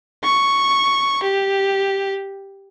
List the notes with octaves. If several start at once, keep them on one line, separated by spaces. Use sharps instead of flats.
C#6
G4